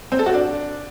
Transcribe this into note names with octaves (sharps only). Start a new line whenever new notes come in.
C4
A4
F#4
D4